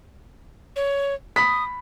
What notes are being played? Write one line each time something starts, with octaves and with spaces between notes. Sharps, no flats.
C#5
B5 D#6 B6